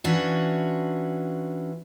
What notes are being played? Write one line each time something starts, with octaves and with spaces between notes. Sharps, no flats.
E3 C#4 D4 F4 F#4